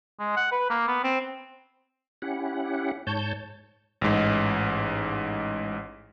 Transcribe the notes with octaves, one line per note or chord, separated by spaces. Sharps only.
G#3
F#5
B4
A#3
B3
C4
C#4 E4 G4 F#5
G#2 C#5 A5 G6
A1 G#2